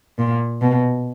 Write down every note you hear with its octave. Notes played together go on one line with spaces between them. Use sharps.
A#2
B2